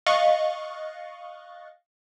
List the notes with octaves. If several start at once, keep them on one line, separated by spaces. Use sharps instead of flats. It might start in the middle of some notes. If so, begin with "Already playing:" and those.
D#5 F5 C#6 F#6 A6 C#7